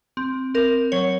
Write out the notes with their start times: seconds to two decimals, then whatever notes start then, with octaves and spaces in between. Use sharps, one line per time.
0.17 C4
0.54 C4 A#4
0.92 F#3 C#5